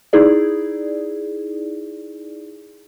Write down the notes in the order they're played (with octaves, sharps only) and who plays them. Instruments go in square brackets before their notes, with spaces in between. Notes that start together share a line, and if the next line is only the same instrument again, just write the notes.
[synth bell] D#4 E4 G#4 D5